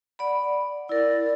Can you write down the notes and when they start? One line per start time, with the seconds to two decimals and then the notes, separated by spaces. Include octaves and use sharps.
0.19 D5 F#5 B5
0.89 E4 A#4 D5